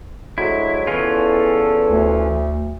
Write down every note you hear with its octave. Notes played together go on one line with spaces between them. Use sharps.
D2 F#3 G#3 E4
E2 E3 C#4 F4 A4
D2